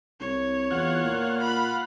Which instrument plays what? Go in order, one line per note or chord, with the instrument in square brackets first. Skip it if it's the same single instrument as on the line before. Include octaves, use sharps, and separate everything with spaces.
[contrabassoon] C2 [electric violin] C#5
[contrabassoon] E2 [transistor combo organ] F4 F#5
[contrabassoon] A#2
[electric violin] B5